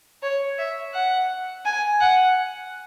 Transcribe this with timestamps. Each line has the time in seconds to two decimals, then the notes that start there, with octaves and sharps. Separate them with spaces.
0.23 C#5
0.58 E5
0.94 F#5
1.65 G#5
2.00 F#5